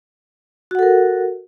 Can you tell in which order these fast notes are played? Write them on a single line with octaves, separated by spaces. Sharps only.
F#4 F#5 A4 A#4